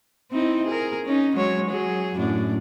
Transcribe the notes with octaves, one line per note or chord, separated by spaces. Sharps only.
C4 D#4 E4
G#4 A#4
C#4 D#4
F#3 G#3 C#5
F#3 G#4
F#2 A2 D4